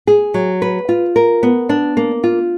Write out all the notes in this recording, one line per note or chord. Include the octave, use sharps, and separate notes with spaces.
G#4
F#3
B4
F4
A#4
B3
D4
A#3
F4